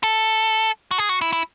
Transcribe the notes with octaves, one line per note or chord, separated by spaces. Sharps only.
A4
F#4
G#4
F#4
E4
E4